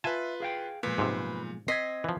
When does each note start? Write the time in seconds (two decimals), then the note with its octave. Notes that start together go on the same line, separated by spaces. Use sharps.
0.04 F4 B4 E5 G#5 A5
0.40 G#4 F5 G5
0.83 B1 A#2 F3 G#3 B4
0.98 G#2 C3
1.68 C4 D#5 G#6 B6 C7
2.04 E3 F3